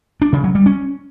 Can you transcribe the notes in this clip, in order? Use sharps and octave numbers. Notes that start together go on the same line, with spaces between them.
D4
C#3
F#3
G3
C#4